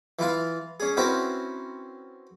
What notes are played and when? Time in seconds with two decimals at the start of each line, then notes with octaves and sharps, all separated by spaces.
0.19 E3 E4 F4 F5
0.80 C#4 G#4
0.97 C4 C#4 E4 F#4 A#4 B4